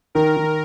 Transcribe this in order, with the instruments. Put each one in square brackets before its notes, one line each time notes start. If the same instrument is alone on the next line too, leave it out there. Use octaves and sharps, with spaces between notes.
[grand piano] D#3 [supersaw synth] A#4
[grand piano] D#3